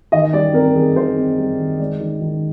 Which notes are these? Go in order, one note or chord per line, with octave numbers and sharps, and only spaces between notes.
D#3 D#5
G3 D5
C4 A#4
D#3 G#4
D#3 C5
C4
G3
D#3
G#3 D5
D#3
D#3